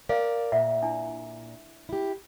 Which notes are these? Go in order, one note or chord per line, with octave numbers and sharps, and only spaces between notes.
A#4 D5 F5
A#2 F4 E5 F#5
D4 E4
E4 G4